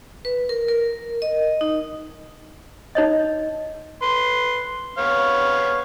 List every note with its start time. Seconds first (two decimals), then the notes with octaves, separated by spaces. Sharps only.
0.25 B4
0.49 A#4
0.68 A#4
1.22 D#5
1.61 D#4
2.95 D#4 C#5 D#5
4.02 B4 C6
4.98 B3 C#5 F5